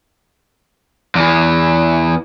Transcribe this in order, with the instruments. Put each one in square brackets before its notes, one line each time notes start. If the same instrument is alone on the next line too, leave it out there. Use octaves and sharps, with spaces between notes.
[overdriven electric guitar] E2 E3